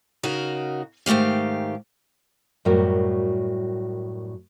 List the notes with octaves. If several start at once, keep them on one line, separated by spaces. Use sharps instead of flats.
C#3 D#4 F#4 A#4
G#2 D#3 A3 G4 F5
F#2 A2 G3 F#4 A#4 C5